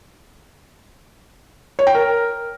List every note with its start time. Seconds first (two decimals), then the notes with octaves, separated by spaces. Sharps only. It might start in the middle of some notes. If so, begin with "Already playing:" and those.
1.79 C#5
1.87 G5
1.95 A#4